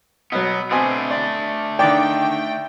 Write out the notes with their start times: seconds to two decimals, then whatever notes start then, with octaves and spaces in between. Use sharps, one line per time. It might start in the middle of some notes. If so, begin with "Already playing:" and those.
0.32 B2 F#3 B3
0.71 B2 A3 C4 D4 G#5
1.11 D5
1.79 D3 D#3 D5 G5